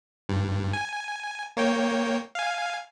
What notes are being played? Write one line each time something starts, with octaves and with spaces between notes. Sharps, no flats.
G2
G#5
A#3 C#5 G5
F5 G#5